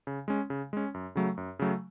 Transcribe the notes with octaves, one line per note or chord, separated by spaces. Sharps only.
C#3
G#3 C#4
C#3
G#3 C#4
F#2
C#3 F#3 A3
F#2
C#3 F#3 A3